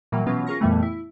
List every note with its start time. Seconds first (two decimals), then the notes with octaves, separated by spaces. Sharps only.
0.12 A#2 E3 F#3 G3 A#3
0.26 B2 E3 F#3 B3 C#4 F4
0.47 C#4 F4 G#4 A#4 C#6 A#6
0.60 F2 A#2 E3 G3 A3 B3
0.83 E4